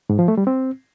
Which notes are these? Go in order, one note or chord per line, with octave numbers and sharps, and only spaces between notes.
G#2
F3
A3
G3
C4